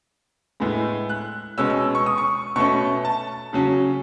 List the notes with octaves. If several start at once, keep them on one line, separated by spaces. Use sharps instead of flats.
A2 G#3 B3
F#6
B2 G#3 C#4 E6
E6
C#6
D#6
C#6
B2 A3 C#4 C#6
A5
C#3 F#3 C#4